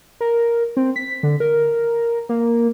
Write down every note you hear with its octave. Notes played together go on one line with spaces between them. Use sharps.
A#4
C4
B6
D3
A#4
A#3